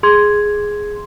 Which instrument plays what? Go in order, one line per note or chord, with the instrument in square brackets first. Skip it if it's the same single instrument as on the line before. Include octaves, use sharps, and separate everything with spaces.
[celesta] G#4 C6 G#6